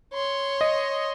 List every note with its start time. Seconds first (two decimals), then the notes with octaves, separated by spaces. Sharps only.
0.13 C#5 C6
0.61 D#5